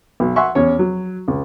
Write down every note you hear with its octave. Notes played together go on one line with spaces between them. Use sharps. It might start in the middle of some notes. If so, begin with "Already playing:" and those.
B1
E5 F#5 G#5 C6 C#6
E2 C#4 C#5
F#3
C#2